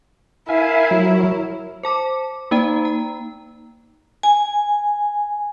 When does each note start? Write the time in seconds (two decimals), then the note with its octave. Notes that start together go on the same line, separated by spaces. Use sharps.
0.49 E4 A#4 E5 F5 G#5
0.91 F#3
1.83 C5 A5 D6
2.51 A#3 D#4 D5 G5 A#5
2.85 A#5
4.23 G#5